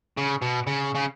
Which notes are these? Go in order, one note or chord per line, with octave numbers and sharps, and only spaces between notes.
C#3
B2
C#3
C#3